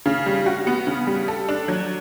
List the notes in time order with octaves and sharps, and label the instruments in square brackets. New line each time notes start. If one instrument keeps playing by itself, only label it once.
[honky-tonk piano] C#3
G3
F#4
B3
C#3
G3
A4
D4
F#3